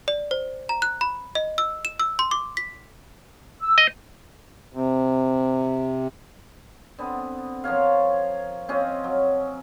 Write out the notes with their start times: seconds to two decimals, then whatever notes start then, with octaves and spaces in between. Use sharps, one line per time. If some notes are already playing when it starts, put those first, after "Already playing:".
0.08 D5
0.31 C5
0.69 A#5
0.82 F#6
1.01 B5
1.35 D#5
1.58 E6
1.85 E7
2.00 E6
2.19 C6
2.31 D6
2.57 B6
3.60 E6
3.78 D#5
4.73 C3
6.99 D3 B3 C4
7.64 F3 A#4 C#5 F5
8.68 C4 C#4 F4 D#5
9.04 F#3